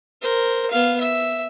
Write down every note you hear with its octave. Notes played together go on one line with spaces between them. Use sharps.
A#4 C5
B3 F5
E5